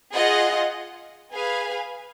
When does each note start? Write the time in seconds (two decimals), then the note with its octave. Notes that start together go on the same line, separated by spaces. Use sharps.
0.14 F4 G#4 D#5 F#5
1.31 G#4 B4 F5 G#5